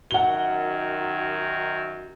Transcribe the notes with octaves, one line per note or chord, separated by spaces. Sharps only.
F#2 D#3 F#4 F#5 G7